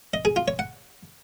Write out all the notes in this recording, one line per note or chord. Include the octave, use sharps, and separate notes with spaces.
D#5
G#4
F4
C#5
F#5